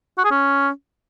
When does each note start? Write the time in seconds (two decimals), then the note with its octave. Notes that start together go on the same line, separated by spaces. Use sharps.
0.18 F#4
0.24 G#4
0.31 C#4